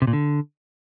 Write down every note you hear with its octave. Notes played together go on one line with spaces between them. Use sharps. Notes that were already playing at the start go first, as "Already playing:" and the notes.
C3
A#2
D3